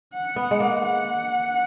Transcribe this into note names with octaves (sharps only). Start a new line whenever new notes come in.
F#5
B3
G#3
A#3
F#5